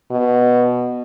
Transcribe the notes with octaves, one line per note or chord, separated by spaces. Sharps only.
B2